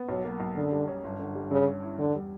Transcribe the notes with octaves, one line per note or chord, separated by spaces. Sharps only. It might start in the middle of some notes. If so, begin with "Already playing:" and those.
Already playing: B3
B1 F#3
A#3
B1
F#2 D3
G3
C#4
G1
D3
G3
G2 C#3
C#4
E4
E2 D3
G3